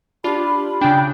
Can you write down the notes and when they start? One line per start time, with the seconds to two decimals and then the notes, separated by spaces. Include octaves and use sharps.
0.24 D4 F4 G4 B5
0.81 C#3 D4 G5